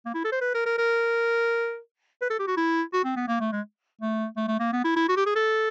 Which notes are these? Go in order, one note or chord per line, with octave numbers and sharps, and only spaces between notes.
A#3
E4
A4
C5
B4
A#4
A#4
A#4
B4
A4
G4
F#4
E4
F#4
C4
B3
A#3
A3
G#3
A3
A3
A3
A#3
B3
E4
E4
F#4
G4
G#4
A4